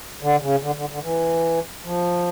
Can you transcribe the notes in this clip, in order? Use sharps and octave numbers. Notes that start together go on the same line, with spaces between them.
D3
C#3
D3
D3
D3
E3
F3